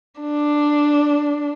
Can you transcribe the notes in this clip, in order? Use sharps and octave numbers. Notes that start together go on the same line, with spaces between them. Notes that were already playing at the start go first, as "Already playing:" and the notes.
D4